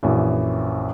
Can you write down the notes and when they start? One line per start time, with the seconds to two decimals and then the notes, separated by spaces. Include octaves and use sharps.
0.03 A#1 F#2 E3